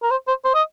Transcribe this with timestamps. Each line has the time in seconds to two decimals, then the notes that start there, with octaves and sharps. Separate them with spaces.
0.03 A#4
0.11 C5
0.28 C5
0.45 C5
0.54 D#5